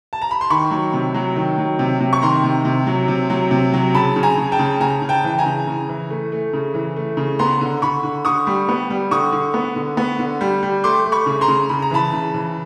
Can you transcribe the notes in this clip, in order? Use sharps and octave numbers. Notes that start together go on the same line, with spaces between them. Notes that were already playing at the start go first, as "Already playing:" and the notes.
A5
A#5
B5
C6
D#3 B5 C#6
F#3
C3
F#3
D#3
F#3
C3
C3
C#6
D#3 A#5 C6
C3
C3
F#3
C3
F#3
C3
F#3
C#3 A5 B5
C#3
G#5 A#5
C#3
G5 A5
C#3
C#3 G#5 A#5
C#3
G5 A5
E3
G#5 A#5
C#3
C#3
E3
A3
A3
C#3
E3
A3
C#3
B3 A#5 C6
D3
D3 B5 C#6
D3
D3 C#6 D#6
G3
B3
G3
D3 C#6 D#6
D3
B3
D3
B3
D3
G3
G3
A3 C6 D6
A3
B5 C#6
C#3
A#5 C6
C#3
C#3 B5
A#5
E3 A5 B5
C#3
E3